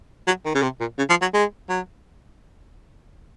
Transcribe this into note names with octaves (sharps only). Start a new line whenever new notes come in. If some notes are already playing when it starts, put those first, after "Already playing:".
F#3
D#3
C#3
C3
A#2
C#3
F3
F#3
G#3
F#3